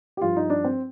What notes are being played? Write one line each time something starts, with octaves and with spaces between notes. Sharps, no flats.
G4
G2 F3 F4
D#4
D4
C4